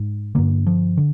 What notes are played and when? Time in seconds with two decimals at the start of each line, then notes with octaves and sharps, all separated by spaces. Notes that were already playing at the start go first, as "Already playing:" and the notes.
Already playing: G#2
0.35 G2 D3 A#3
0.67 F3
0.97 D3